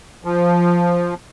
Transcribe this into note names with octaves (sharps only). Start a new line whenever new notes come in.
F3